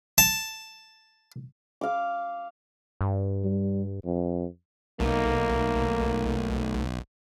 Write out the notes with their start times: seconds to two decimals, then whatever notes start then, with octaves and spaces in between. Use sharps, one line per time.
0.18 A5
1.81 F5 D6
3.01 G2
3.45 G3
4.05 F2
5.00 B1 A3 A#3 D#4